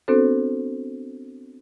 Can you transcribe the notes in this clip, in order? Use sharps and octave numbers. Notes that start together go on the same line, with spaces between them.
B3 C4 D4 F#4 A4 C5